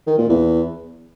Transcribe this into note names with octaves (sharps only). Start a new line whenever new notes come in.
D#3
A#2
E2